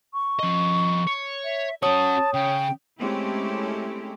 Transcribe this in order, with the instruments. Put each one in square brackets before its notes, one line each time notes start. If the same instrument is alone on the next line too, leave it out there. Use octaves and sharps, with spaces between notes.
[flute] C#6
[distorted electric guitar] F3 D#5
C#5
[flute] E5
[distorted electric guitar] C#4 F#4 [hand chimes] C#5 D#6 [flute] A5
[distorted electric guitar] C#3 [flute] G5
[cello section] G#3 A3 C4 C#4 E4 G4